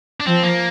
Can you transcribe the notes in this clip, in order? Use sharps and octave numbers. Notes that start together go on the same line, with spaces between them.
D4
F3 C4
A#3